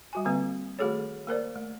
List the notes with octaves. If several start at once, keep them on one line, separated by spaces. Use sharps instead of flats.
G3 F#4 G#5
D3 G3 A#3 C4 B4
D#3 A3 F#4 G#4 A4 C#5
A#3 A#4 C5 D5
A3